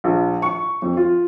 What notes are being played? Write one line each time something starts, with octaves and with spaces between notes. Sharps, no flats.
A#1
C#6
F2
F4